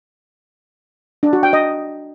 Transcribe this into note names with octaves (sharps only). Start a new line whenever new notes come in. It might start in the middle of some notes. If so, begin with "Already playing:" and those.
D4
F#4
G5
D#5